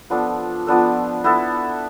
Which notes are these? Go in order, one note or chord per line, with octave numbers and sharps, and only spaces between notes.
F3 B3 D4 A4
F3 B3 D4 A4
B3 E4 A4